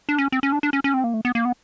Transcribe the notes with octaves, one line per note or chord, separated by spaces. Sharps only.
D4
C#4
C4
C#4
D4
D4
C#4
C#4
C4
A#3
A3
B3
A#3
B3